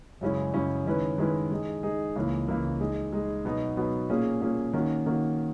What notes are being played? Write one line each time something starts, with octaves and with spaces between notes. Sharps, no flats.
F#2 C#3 G#3 C#4 E4
F#2 C#3 G#3 C#4 E4
D#3 G#3 C#4 E4 B4
D#3 G#3 C#4 E4 B4
G#3 D#4 G#4
G#3 D#4 G#4
C#2 C#3 E3 A#3
C#2 C#3 E3 A#3
G#3 D#4 G#4
G#3 D#4 G#4
B2 F#3 B3 D#4
B2 F#3 B3 D#4
A#2 A#3 C#4 G#4
A#2 A#3 C#4 G#4
D#3 A#3 C#4 F#4
D#3 A#3 C#4 F#4